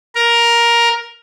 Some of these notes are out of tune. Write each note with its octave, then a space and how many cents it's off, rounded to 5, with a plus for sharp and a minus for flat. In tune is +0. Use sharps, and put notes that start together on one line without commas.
A#4 +10